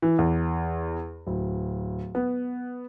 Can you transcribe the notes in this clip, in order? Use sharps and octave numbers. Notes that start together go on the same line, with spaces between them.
E3
E2
D1
B3